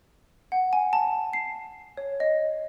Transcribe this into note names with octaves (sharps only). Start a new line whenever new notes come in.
F#5
G#5
A5
C7
C#5
D#5